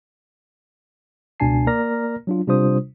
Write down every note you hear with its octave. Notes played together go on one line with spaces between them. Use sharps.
C#2 B2 D4 G#5 A5 C7
A#3 A#4 D5 A#5 F6 A#6
F#3 D4 F4
C3 G3 D4 F4 C5 D#6